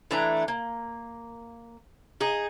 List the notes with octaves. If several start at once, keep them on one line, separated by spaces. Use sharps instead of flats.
E3 A3 D4 A#5
A#3
D#4 G#4